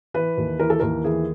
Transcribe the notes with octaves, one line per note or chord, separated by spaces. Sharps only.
E3 B4
D#2
E3 A#4
A4
D#2 A#4
E3 G#4